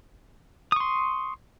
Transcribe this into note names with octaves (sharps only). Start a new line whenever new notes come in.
C6 C#6 D#6